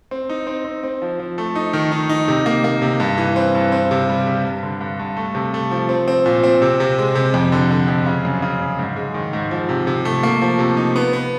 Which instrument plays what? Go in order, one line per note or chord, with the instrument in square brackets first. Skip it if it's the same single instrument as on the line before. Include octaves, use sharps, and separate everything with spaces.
[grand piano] C4
D#4
C4
C4
C4
F3
F3
A3
D#4
D#3
D#4
D#4
C3
A#3
A#3
C3
G2
E3
C4
G2
C4
C3
G3
C3
G2
D3
G2
G2
A3
C3
A3
F3
C4
C4
A#2
C4
C3
C3
G#3
C3
F2
D3
D3
F2
C#3
F#2
C#3
F#2
G#2
G#3
D#3
G#2
F3
C3
C3
A3
A#3
F3
C3
D#4
B3
B3